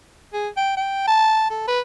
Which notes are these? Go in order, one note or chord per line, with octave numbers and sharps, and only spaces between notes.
G#4
G5
G5
A5
A4
B4